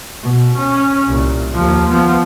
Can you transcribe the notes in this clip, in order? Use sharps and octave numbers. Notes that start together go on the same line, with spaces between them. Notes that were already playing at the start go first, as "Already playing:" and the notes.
B2
C#4
C2 A#2
D#2 F3
F3 B3